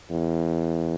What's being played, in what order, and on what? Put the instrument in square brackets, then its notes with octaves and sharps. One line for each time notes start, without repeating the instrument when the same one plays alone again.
[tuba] E2